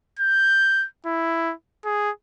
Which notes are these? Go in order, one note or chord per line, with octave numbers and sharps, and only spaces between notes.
G6
E4
G#4